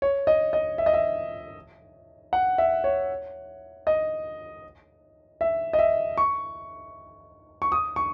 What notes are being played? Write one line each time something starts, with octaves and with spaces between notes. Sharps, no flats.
C#5
D#5
D#5
E5
D#5
E5
F#5
E5
C#5
D#5
E5
D#5
E5
C#6
C#6
D#6
C#6